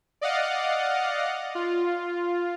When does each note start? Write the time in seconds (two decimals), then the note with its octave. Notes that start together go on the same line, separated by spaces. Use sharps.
0.21 D5 D#5 F5 F#5
1.55 F4